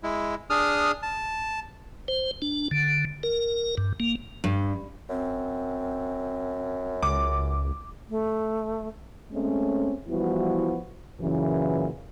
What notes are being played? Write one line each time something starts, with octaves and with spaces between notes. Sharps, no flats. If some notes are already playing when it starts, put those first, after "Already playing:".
G#3 E4
D4 G#4 D#6 F6
A5
C5
D4
D3
A#4
G2
A#3
G2
F#2 C4
C#2 D6
A3
G#3 A3 C4 C#4
E3 F3 G3 B3 E4 F#4
F#2 A#2 C#3 E3